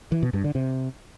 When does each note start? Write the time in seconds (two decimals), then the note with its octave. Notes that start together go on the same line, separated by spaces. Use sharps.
0.12 E3
0.23 B2
0.33 G2
0.44 D3
0.55 C3